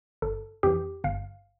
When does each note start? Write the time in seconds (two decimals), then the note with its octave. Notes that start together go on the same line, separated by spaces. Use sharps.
0.22 G1 A4
0.63 F2 E3 G4
1.04 G1 F5